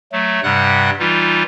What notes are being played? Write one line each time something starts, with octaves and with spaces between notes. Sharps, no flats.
F#3 A3
G2 C3 G3 F#5 F#6
E3 G3 D#4 F4